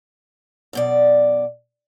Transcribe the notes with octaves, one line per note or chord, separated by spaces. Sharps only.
F#2 B2 D5